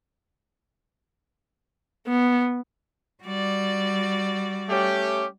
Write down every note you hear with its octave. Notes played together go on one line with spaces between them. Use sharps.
B3
G3 F#4 D5
A3 C#4 G4